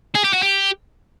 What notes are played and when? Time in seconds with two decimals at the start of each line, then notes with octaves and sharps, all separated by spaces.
0.15 G#4
0.24 G4
0.33 F#4
0.42 G4